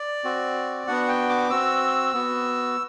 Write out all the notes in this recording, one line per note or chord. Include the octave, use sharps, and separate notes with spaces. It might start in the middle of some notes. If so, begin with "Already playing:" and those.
Already playing: D5
C4 F#4
B3 D4 F#4 F#5
G5
D6
C4 F#4 E6
B3 F#4